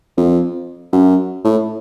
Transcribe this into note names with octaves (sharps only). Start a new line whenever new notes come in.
F2
F#2
A2